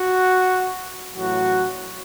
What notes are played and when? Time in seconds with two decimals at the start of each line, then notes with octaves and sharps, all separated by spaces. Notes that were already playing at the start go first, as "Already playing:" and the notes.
Already playing: F#4
1.15 A1 A2 F#3 F#4